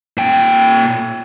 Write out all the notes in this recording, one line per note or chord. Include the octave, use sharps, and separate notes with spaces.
A#2 G5